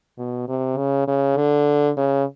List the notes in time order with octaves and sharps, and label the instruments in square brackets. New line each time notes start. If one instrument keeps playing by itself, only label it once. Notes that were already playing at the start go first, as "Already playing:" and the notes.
[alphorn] B2
C3
C#3
C#3
D3
C#3